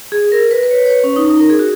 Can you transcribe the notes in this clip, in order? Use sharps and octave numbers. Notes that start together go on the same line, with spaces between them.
G#4
A#4
B4
B4
C#5
C#5
B4
C#4
D#4
D#4
A#4
G#4
F#4